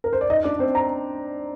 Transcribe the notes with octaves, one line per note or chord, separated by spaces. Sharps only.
A#4
C5
D5
D#4 D#5
D4 D5
C4 C5
A#5